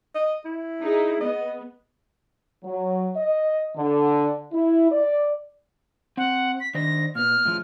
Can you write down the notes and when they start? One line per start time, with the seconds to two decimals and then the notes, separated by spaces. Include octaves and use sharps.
0.15 D#5
0.45 E4
0.82 D#4 G#4
1.21 B3 D#5
2.64 F#3
3.17 D#5
3.77 D3
4.53 E4
4.92 D5
6.17 C4 F#5
6.60 B6
6.75 D#3 D4 C5 A#6
7.15 A#2 B3 F6
7.45 A2 C#3 F3